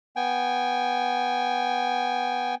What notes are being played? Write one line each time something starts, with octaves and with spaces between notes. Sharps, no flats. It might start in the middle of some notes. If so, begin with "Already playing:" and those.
B3 G5 G#5